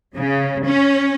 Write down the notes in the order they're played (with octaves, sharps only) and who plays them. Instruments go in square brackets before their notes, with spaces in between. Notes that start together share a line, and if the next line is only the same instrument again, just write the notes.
[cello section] C#3
C#4